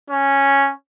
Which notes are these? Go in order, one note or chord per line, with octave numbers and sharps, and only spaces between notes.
C#4